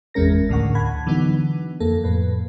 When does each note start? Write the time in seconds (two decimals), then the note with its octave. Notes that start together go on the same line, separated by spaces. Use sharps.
0.14 G#1 E2 G#3 C#4 A#4 A#6
0.49 D2 A2 D3 A#4 F#5 C#6
0.75 F#5 A5 B5 G#6
1.07 D3 E3 F#3 B3 D#4
1.80 F2 A#3 A4
2.04 F2 A2 B4